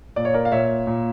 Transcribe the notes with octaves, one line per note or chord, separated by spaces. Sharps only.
A#2 D5
C#5
A#4 D5
F5
A#2 C#5 E5
A#2